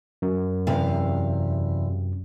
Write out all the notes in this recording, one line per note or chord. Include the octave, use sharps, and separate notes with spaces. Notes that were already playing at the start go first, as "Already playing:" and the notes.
F#2
E2 C3 F5